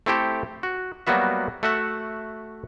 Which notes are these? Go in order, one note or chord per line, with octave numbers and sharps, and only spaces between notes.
A3 C4 E4 G4 A4
F#4
F#3 G3 A#3 B3 F#4 E5
A3 F#4 E5 F#5